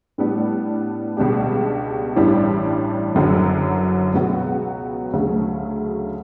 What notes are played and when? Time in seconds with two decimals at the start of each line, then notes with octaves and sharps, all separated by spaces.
0.18 A2 G3 B3 D4
1.17 C#2 B2 G3 D4 G4
2.16 A1 G2 E3 G3 D4
3.15 F#1 F#2 D3 F#3
4.14 C#2 B2 F#3 B3 F#4
5.13 D2 C#3 F#3 A3